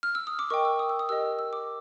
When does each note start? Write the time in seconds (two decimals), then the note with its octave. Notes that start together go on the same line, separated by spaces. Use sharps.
0.03 F6
0.15 E6
0.27 D#6
0.39 D6
0.50 A#4 D#5 G5 C#6
0.65 E6
0.79 D#6
0.89 E6
0.99 D#6
1.09 G4 A#4 D#5 G5 E6
1.39 E6
1.53 D6